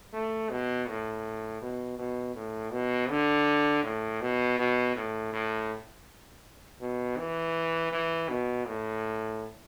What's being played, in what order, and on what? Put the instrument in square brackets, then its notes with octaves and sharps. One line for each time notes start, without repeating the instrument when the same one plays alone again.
[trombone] A3
B2
A2
B2
B2
A2
B2
D3
A2
B2
B2
A2
A2
B2
E3
E3
B2
A2